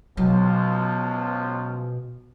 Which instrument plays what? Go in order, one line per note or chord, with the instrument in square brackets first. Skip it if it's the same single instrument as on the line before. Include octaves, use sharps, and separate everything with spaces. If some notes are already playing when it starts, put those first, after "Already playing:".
[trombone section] C#2 F3 [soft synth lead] B2 [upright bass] F#3